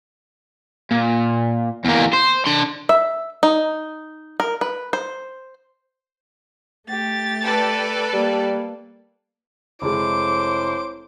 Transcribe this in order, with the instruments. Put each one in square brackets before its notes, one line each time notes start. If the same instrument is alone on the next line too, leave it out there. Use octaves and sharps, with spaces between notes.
[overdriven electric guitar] A#2
E2 A#3
C5
D4 C6
[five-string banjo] E5
D#4
A#4
B4
C5
[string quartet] A3 G4 A6
[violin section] A4 B4 D5
[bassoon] G3 [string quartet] A#3
[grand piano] F1 G#3 [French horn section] E4 A4 C#5 [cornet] C5 [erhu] D6